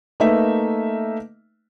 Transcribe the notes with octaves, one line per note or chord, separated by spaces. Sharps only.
A3 A#3 D#4 B4 E5